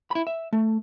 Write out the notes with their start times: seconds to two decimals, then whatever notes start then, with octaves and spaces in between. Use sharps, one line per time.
0.11 E4 B5
0.27 E5
0.53 A3